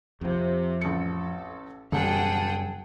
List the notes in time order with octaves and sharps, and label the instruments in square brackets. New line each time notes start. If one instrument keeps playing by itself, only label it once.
[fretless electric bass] F2 F3 [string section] C3
[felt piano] A1 C#7 [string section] A4
[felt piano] E1 [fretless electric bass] F#2 C#3 G3 [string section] G#4 F#5 G5 [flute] A5